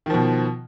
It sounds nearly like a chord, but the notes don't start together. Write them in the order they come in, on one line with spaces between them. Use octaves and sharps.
D#3 F3 B2